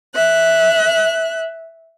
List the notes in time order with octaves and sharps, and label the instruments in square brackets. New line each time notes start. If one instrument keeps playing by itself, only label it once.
[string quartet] E5 F#6